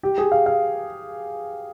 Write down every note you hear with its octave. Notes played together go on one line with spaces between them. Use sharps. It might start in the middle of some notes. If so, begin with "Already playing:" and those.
G4
G#4
F5
F5